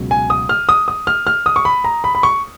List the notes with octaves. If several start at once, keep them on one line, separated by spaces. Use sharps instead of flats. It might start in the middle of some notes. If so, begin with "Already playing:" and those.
Already playing: C#2 B2 F#3
G#5
D#6
F6
D#6
D#6
F6
F6
D#6
C#6
B5
A#5
B5
B5
C#6